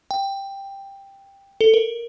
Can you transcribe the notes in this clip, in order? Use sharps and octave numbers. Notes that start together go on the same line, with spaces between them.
G5
A4
A#4